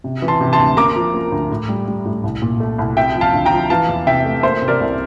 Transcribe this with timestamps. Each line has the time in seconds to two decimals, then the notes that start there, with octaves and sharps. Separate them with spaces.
0.04 C3
0.22 E3
0.28 A5 C6
0.41 C3
0.53 A5 C6
0.59 D2
0.77 A#3 A#5 D6
0.96 F3
1.14 A#3
1.32 D2
1.50 A2
1.69 G3
1.87 G3
2.05 A2
2.24 C2
2.42 A#2
2.60 A3
2.78 C2
2.97 C3 E5 G5
3.16 F3
3.21 F5 A5
3.34 D2
3.46 G5 A#5
3.52 F3
3.70 E3 F5 A5
3.89 E2
4.06 C3 E5 G5
4.25 A3
4.43 A#3 C5 E5
4.62 C3
4.68 A#4 D5
4.80 C2